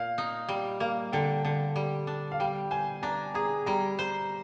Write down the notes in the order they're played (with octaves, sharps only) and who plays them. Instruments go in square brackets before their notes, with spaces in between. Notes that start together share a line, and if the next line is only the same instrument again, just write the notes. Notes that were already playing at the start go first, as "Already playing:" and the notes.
Already playing: [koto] A#2 [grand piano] F5
[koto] D#4
G3
A#3
[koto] D3 [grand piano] G5
[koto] D3
G3
D4
[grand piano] F5
[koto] G3 [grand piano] G5
[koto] C5 [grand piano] G#5
[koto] D4 [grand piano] A#5
[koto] G#4 [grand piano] A#5
[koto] G3 [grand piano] A#5
[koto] C5